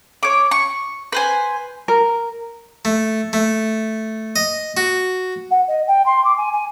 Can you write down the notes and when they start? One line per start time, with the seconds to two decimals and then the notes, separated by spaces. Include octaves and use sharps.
0.23 C#5 D6
0.51 C#6
1.12 B4 C5 G#5
1.88 A#4
2.85 A3
3.33 A3
4.36 D#5
4.77 F#4
5.50 F#5
5.67 D#5
5.87 G5
6.06 C6
6.24 D6
6.37 G#5
6.52 G#5